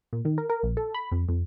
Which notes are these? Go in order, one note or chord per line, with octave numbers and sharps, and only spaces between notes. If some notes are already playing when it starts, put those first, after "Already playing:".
A#2
D#3
A#4
A#4
A#1
A4
B5
F2
F2